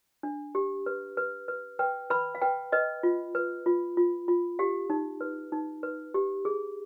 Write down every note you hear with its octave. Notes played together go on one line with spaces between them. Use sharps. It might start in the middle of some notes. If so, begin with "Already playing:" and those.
D4
G4
B4
B4
B4
B4 G5
B4 B5
F5
B4 G5
B4 D#5
F4
B4
F4
F4
F4
G4 F5
D#4
B4
D#4
B4
G4
G#4